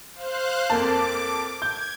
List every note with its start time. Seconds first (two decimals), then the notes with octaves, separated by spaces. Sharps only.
0.13 C5 F5 F#6
0.70 F2 A#3 A5 D6
1.62 G6 G#6